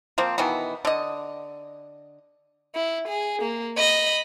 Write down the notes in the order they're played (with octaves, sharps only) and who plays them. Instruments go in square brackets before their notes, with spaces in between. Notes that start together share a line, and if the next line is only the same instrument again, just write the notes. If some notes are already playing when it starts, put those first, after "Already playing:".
[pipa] F3 A#3 C4
B2 D#3 E3 B3
D3 D#5
[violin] E4
G#4
A#3
D#5 B5